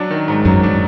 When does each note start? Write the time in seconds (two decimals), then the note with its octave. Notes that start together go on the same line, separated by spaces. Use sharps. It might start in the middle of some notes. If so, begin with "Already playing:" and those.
Already playing: F#3 D4
0.11 D#3
0.28 G#2
0.45 F#2 F#3
0.63 D4